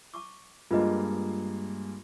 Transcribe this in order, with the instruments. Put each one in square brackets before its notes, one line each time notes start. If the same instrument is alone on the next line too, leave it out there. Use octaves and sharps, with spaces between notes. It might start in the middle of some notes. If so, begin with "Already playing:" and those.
[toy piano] A5 C#6 D6
[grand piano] G2 G#3 A#3 [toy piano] F4 B4 D#5